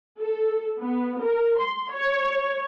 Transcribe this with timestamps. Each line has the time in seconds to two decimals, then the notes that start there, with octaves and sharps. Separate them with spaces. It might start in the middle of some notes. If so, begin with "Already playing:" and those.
0.19 A4
0.79 B3
1.20 A#4
1.58 C6
1.91 C#5